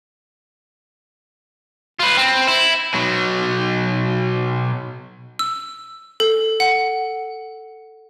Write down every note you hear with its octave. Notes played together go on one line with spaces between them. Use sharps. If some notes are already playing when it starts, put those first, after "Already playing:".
F4 B4
C4
E4
B2 F#3
E6
A4
F#5